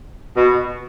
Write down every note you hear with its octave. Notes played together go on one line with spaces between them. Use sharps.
B2